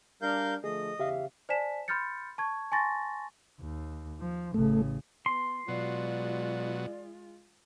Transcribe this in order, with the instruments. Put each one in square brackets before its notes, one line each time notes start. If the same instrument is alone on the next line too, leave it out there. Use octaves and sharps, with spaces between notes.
[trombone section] G3 D4 [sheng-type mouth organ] A#4 F5 G6
[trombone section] D3 F3 A3 [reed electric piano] G#4 [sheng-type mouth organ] D#5
[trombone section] E2 C#3 [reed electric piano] G4 E5 F5
[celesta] C5 D5 G#5 A5 B6 E7
B5 C6 F6 G6 A6 C#7
A5 C#6 G#6
G#5 A5 C6 C#6 A6 A#6
[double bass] D#2
F3
[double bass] A1 C#3 [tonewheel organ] A3
[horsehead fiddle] B3 [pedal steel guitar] C6
[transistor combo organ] B2 F#3 [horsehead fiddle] G#3 F4 [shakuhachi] D5